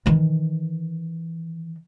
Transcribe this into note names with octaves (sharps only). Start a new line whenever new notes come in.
D#3 E3